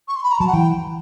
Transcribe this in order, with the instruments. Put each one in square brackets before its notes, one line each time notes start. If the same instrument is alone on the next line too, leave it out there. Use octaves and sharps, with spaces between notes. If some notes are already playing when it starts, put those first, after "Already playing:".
[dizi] C#6
C6
B5
A#5
[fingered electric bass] F#3 [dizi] A5
[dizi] F#5
[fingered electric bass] E3 [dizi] G5